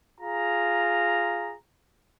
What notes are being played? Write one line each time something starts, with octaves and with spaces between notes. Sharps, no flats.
F4 G#4 A#5